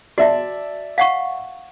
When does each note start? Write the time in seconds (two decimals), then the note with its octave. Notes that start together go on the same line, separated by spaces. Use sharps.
0.18 F#4 D5 E5 A5
0.98 F5 F#5 C#6